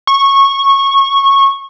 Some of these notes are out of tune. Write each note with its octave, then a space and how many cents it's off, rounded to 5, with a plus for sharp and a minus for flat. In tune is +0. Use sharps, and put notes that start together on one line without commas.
C#6 -15